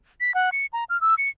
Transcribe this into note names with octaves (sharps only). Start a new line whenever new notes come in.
B6
F#5
C#7
A#5
F6
E6
C#7